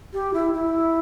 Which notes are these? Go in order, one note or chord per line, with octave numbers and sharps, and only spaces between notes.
G4
E4
E4